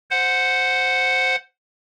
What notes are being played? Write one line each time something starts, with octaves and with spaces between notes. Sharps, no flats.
C5 F#5